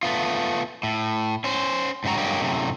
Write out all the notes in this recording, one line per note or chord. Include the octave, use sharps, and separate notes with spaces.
A3 B3 F4
A2
C#4 C5
G#2 C#3 C4 F#4 A#5
G2 F#3 G#3 A#3 G4
F#2 A2 C3